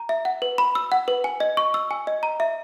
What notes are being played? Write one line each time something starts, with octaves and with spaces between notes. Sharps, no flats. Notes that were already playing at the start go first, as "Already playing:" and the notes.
Already playing: A#5
E5
F#5
B4
B5
E6
F#5
B4
G#5
D#5
C#6
E6
G#5
D#5
A#5
E5